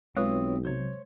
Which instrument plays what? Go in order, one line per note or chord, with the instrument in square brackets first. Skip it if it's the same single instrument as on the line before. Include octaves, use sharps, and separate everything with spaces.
[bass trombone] B1 [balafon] G#3 [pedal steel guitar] C4 E4 D#6 [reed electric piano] F4 B4 C#5
[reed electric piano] C3 F#3 [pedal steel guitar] C5 C#5